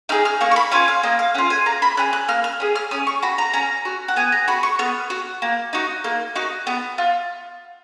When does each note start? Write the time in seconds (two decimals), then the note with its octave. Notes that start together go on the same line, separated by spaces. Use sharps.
0.09 D#4 G#4 F6
0.25 F6
0.41 A#3 C#6
0.51 C#6
0.56 B5
0.72 C#4 F4 G#5
0.88 F5
1.03 A#3 D#5
1.19 F5
1.34 C#4 F#5
1.38 F4
1.50 G#5
1.66 A#3 A#5
1.82 B5
1.97 C#4 G#4 F#6
2.13 F#6
2.28 A#3 F6
2.44 F6
2.60 C#4 G#4
2.75 F6
2.91 C#4 D#6
3.07 C#6
3.22 F#4 B5
3.38 A#5
3.53 C#4 A#5
3.85 F#4
4.08 F#5
4.16 B3 G#5
4.32 A#5
4.48 F#4 B5
4.63 C#6
4.79 B3 F6
5.10 F#4
5.42 A#3
5.73 D#4 F#4
6.04 A#3
6.35 D#4 F#4
6.67 B3
6.98 F4